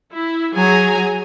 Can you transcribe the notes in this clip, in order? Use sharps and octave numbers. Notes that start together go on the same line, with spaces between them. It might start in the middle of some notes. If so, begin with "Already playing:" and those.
E4
F#3 G#4 G#5 A#5